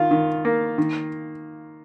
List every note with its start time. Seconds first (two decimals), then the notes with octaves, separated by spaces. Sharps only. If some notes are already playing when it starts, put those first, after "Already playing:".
Already playing: D#3 F4
0.11 D#3
0.45 A#3
0.78 D#3